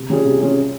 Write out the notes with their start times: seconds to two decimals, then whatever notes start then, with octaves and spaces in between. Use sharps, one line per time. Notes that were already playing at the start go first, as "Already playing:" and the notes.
Already playing: C3
0.10 G3 C#4 F4 G#4
0.25 C3
0.41 G3 C#4 F4 G#4